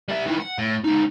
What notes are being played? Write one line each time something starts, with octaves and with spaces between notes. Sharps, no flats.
G3 E5
D#3 E3
F#5
A2
C#2 D#4